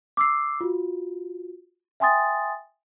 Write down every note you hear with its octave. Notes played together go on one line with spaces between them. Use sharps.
D6 E6 C7
F4 F#4
E5 G5 G#5 C6 D#6 A6